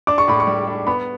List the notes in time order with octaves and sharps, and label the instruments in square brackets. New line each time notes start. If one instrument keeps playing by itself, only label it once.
[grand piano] D4 [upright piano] D6
[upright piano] C#6
[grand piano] A2 [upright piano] B5
[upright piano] C#6
[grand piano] G3
D4
[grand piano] B3 [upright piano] B5